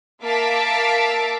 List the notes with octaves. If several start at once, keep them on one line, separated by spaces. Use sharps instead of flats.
A#3 E5 F5 A5 D6 B6